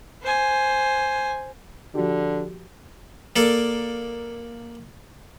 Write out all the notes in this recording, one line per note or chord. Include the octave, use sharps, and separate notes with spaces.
C5 G#5
D3 F3 F#4 G4
A#3 A4 D5